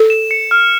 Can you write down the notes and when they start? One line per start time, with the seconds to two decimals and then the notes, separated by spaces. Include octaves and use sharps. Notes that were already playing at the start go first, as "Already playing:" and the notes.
Already playing: A4
0.10 E7
0.31 C#7
0.51 F6